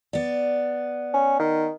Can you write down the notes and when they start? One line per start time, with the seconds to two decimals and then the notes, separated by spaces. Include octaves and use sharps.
0.13 B3 D5
1.14 C#4
1.40 D#3